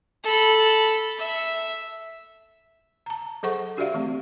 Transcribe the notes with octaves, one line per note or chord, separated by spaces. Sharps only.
A4 B5
E5
A5 A#5
F#3 G#4 A4 C5 F#5 C#6
D4 F#4 G4 D5 E5 F5
E3 A3 C4